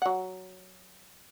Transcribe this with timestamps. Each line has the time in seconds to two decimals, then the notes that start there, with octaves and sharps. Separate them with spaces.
0.02 F#3 F#5